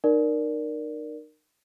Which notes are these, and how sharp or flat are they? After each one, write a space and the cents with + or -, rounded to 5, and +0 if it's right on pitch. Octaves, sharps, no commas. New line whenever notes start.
D#4 -35 A#4 +0 D5 +0